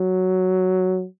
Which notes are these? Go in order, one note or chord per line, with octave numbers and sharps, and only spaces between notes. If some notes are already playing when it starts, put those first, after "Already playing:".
Already playing: F#3